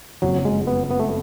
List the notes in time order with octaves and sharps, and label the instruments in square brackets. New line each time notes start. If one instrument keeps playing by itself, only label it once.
[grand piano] F#1 F2 C#3 [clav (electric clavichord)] F#3
[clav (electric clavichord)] G#3
B3
B3
A3